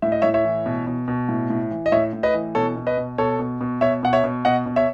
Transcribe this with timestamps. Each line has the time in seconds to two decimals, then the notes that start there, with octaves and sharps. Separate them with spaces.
0.02 A2 E5
0.12 D#5
0.22 A2 C#5 E5
0.34 C#5 E5
0.45 E3
0.66 B2
0.87 B2
1.08 B2
1.29 A2
1.50 A2
1.71 E3
1.86 D#5
1.92 A2 C#5 E5
2.13 A2
2.23 B4 D#5
2.34 E3
2.55 B2 A4 C#5
2.76 B2
2.87 B4 D#5
2.97 B2
3.18 B2 A4 C#5
3.39 B2
3.61 B2
3.81 B2 C#5 E5
4.03 B2 F#5
4.13 C#5 E5
4.24 B2
4.45 B2 D#5 F#5
4.66 B2
4.76 C#5 E5